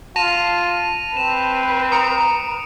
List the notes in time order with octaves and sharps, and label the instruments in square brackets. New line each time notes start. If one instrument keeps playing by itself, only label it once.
[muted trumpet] F4 [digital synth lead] A5 [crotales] A#6 D#7 F7
[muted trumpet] C4 [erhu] B4 [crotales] E7
[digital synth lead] A#5 [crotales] D#6 C#7 D7